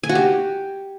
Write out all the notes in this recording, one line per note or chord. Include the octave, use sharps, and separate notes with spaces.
G#5
F#4
G4